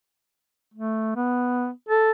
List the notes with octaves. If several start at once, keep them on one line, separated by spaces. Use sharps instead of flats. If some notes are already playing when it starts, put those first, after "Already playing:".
A3
B3
A4